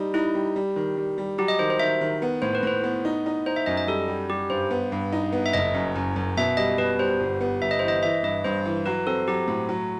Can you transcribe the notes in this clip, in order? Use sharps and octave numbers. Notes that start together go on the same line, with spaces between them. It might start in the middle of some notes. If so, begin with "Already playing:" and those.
Already playing: G3 D#4
D#4 E4
G3
G3
D#3
G3
G3
F#3 G4
D#5
D#3 C5
C5
D#3 E5
D#3
B3
A2 C5
B4
A2 C5
B3
D#4
D#4
D#4 C5
E5
F#2 D#5
D#5
G3 A4
G3
G3 G4
G2 C5
B3
G2
D#4
B3
E5
F#1 D#5
F#2
F#2
F#2
B2 E5
G3 D#5
B2 B4
G3 C5
G1
B3
G1 E5
D#5
E3 C5
D#5
E3 E5
G2 D#5
G2 C5
E3
F#3 B4
C4 A4
F#3 G4
A2
F#3